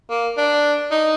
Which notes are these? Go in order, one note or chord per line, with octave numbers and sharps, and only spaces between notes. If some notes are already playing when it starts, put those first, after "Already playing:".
A#3
D4
D#4